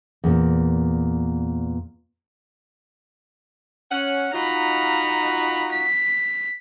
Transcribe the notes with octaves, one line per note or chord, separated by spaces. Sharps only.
E2 A#2
C#4 F#5
D#4 F4 F#4 A#5 B5
B6